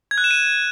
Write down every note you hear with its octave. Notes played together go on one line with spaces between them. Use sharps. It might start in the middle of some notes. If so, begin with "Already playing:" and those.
G#6
F#6
E7
D#7